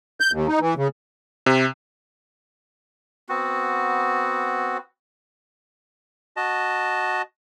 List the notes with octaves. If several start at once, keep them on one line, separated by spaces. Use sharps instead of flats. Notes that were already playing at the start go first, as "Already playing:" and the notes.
G6
D#2
D#4
E3
C#3
C3
B3 C4 F#4
F#4 D#5 A5